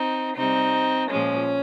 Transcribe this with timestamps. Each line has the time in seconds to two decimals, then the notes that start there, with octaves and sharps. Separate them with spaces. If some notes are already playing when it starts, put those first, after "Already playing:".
Already playing: C4 D#4
0.36 C3 G3 C4 D#4
1.11 A#2 F3 G#3 C#4